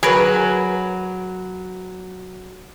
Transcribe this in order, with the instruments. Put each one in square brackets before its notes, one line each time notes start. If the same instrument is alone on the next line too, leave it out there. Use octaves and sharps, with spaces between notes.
[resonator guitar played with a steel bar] F#3 [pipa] G#4 A#4 B4